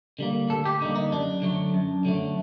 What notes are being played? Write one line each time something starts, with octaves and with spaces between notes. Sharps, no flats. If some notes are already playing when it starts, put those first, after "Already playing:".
D3 G3 A#3
D2 A4
G4
D3 G3 A#3 D#4
D#4
F#2 D4
D3 F#3 A3
F#2
D3 F#3 A3